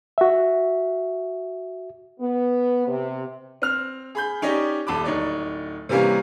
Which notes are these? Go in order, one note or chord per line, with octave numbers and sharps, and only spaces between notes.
F#4 E5
B3
C3
C4 F6 F7
G#4 B5 G6
C#4 D#4 G4 D5 D#5
D#1 A5 B5 D6
D1 D#4 C#5 D5
C3 E3 G3 A#3 C#4